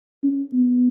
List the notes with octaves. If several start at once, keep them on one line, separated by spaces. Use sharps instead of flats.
C#4
B3